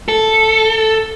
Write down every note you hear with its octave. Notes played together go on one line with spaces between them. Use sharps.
A4